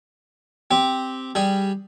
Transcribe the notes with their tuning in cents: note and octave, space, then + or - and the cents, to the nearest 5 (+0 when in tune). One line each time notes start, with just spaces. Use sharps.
C4 -5 G4 +0
G3 +0 G#4 +0